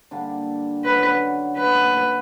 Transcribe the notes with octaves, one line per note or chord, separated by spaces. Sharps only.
D3 G3 A#3 D4
F#2 D3 F#3 B4
F#3 A#3 D4 F#4 B4